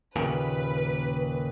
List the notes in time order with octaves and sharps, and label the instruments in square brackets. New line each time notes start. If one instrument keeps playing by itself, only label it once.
[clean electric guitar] D#2 A#2 C#3 [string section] B4